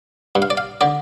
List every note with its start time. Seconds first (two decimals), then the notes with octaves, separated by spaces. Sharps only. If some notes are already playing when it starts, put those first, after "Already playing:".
0.35 G2
0.42 F5
0.50 D5
0.57 F5
0.81 D3 D5